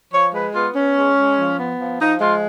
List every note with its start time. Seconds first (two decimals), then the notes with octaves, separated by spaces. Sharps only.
0.13 F3 C#5
0.34 G#3 B4
0.55 B3 F4
0.76 B3 C#4
0.97 G#3
1.17 G#3
1.38 F3
1.59 B3
1.79 F3
2.01 F3 D#4
2.21 G#3 F4